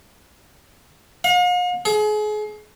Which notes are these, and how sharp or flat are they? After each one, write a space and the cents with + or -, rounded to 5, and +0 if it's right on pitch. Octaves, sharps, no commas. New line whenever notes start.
F5 +45
G#4 +35